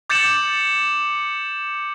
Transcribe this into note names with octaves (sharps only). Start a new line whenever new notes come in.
D6 G6 A6 C#7 E7 F#7